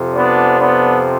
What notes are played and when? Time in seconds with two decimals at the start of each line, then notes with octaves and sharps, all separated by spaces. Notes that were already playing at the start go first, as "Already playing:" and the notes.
Already playing: F2 C3 F3
0.15 B3 D4
0.61 B3 D4